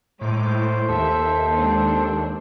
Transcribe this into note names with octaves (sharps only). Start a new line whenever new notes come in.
A2 G#3 D#4 C5 D6
D#2 A4 E5
G#3 C4 D4